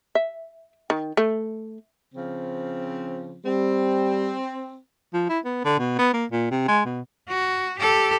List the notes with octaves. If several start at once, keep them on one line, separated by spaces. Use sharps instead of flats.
E5
D#3
A3
C#3 F3 C4
G3 C4
F3
E4
B3
D3
B2
B3
A#3
A#2
C3
G#3
B2
F#4
G4 A4